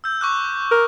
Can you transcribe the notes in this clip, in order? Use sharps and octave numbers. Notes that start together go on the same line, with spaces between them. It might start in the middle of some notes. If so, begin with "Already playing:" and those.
E6 G6
C#6 D6 F#6
A#4